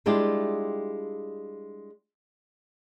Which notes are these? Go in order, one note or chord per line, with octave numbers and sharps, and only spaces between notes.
G3 G#3 D4 E4 F4 G4